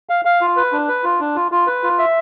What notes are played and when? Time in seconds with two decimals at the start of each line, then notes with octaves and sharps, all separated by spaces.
0.09 F5
0.25 F5
0.41 F4
0.56 B4
0.72 D4
0.88 B4
1.04 F4
1.20 D4
1.36 F4
1.52 F4
1.67 B4
1.83 F4
1.99 E5